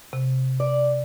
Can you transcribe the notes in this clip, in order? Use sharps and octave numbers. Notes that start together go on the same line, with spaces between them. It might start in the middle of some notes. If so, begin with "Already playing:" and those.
C3
D5